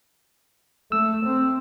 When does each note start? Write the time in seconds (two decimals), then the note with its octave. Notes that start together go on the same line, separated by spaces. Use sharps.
0.92 A3 E6
1.25 C4